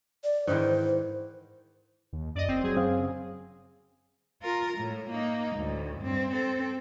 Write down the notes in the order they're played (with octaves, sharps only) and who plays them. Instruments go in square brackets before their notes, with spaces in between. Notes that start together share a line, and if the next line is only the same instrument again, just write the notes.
[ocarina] D5
[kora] G#2 D#3 E3 [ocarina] C5
[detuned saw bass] D#2
[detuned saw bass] F#2 [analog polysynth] D5 D#5
[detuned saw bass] F#1 [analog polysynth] C4
[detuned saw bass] F#3 [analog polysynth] G#4
[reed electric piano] F#2 C4 F5
[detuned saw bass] C#3
[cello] F4 A#4
A2
A#3 D#4
D2 A2
G2 C4
C4 A4